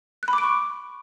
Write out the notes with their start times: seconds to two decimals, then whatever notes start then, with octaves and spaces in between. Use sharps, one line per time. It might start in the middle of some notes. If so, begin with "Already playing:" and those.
0.23 F#6
0.28 B5
0.33 D6
0.38 D7
0.43 C#6